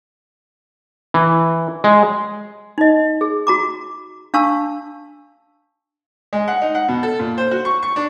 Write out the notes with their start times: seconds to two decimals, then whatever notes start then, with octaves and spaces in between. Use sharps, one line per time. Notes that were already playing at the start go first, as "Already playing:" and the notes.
1.14 E3
1.84 G#3
2.78 D#4 D#5
3.21 G#4
3.47 F#4 A#5 D6
4.34 D4 F5 A5 C#6 E6
6.33 G#3
6.48 F#5
6.62 D#4
6.75 F#5
6.88 B2
7.03 A4
7.19 A#2
7.38 C5
7.51 F#4
7.65 C#6
7.83 C#6
7.96 D4